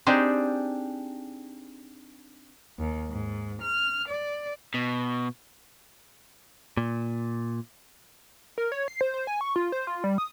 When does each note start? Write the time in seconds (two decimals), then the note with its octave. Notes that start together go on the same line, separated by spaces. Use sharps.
0.06 C4 D4 D#4 G4 G#4
2.78 D#2
3.10 G#2
3.61 F6
4.08 D5
4.74 B2
6.77 A#2
8.58 A#4
8.72 C#5
8.88 C7
9.01 C5
9.14 C5
9.27 G#5
9.41 C#6
9.56 F4
9.72 C5
9.87 F4
10.04 G3
10.18 D#6